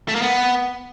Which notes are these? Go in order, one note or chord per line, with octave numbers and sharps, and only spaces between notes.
A3
A#3
B3